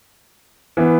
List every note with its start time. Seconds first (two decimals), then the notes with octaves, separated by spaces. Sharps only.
0.77 E3 B3